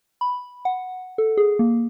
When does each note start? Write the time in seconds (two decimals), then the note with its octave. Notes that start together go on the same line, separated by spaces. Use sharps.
0.21 B5
0.65 F#5
1.18 A4
1.37 G#4
1.59 A#3